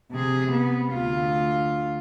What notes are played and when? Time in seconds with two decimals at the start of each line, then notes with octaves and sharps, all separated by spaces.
0.11 C3 G#4
0.53 B3
0.93 D2 F4